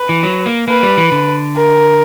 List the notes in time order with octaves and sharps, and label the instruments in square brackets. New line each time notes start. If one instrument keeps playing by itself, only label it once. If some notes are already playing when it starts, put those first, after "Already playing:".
Already playing: [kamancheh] B4
[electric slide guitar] E3
F#3
A#3
[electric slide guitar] A#3 [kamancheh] B4
[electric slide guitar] G3
E3
D3
[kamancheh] A#4